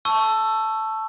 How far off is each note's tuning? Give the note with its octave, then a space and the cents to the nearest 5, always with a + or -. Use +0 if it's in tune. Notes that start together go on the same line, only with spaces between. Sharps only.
A5 +0 C#6 +0 E6 +15